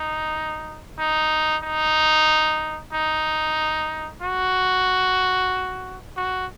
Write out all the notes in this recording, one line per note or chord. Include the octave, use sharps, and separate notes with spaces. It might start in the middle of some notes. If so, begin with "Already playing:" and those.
Already playing: D#4
D#4
D#4
D#4
F#4
F#4